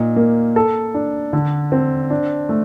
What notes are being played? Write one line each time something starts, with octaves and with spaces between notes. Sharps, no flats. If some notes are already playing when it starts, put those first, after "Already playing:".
Already playing: A#2 D#4
A#3
A4
D4
D3
C4
D4
A3